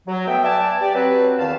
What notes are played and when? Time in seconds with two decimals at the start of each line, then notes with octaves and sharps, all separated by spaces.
0.08 F#3
0.27 B2 A3 B3 E5 G5
0.44 B4 D5 E5 G#5 A5
0.82 G4 D5
0.95 F#3 C4 B4
1.39 E2 D#3 F5 A5